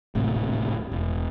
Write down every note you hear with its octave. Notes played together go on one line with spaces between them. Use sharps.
D1 G#1 A2 C3
E1